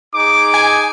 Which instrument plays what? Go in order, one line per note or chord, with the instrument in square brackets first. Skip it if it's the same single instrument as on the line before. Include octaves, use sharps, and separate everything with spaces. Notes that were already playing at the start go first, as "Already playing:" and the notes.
[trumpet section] D#4 G#4 D6
[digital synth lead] G#5